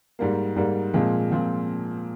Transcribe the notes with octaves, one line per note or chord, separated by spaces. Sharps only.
G#2 G3 A#3
G#2 G3 A#3
A#2 F3 G#3 C4 F4
A#2 F3 G#3 C4 F4